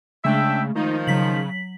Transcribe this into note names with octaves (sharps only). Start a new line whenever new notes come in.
C#3 G#3 A3 D4 E5 G5
D#3 F3 D#4
C#3 F#3 B6 F#7